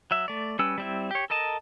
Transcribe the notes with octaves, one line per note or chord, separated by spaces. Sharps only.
F#3 E5
A3 D5
G3 C#4 B4 E6
G3 C4 E4
G4 C#5
A4 A#4 D#5 A5